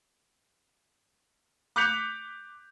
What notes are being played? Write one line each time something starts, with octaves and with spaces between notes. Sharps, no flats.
D6 F#6 G6 B6 C#7 F7